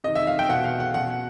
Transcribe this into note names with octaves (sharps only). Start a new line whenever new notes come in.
C3 D#3 D#5
E5
F5
G5
B2 F#5
F5
F#5
B2 F#5